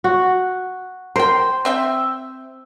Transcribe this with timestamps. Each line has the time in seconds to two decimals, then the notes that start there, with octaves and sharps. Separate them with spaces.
0.04 F#4
1.16 A#4 C5 G5
1.65 C4 E5 G5